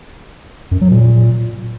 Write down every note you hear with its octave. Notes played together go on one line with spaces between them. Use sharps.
F#2
F#3
A#2